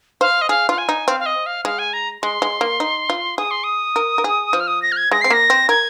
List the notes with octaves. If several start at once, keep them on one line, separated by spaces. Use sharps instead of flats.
C5 F5
D#5
G#4 F5
F4 F5
G#5
D#4
C4 F5
F5
D#5
F5
G#3 F5
G#5
A#5
G#3 C6
G#3
A#3
D#4
F4
G#4 D#6
C6
D#6
A#4
A#4
G#4
F3
F6
D#6
A#6
F6
G#6
G#3 A#6
C4 C7
A#3 A#6
C4
A#4 G#6